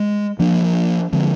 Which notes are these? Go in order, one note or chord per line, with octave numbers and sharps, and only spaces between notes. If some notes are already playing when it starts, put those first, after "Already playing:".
Already playing: G#3
F3 A#3 D4
D3 F3 G#3 C4